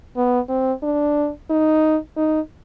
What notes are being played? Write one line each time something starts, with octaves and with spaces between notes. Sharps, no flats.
B3
C4
D4
D#4
D#4